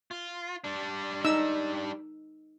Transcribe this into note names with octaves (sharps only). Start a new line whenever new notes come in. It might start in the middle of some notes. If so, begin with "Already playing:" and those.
F4
G3 D4
D#4 E6